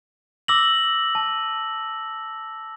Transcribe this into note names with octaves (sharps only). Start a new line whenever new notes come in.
D6 E6 A#6 F#7
A5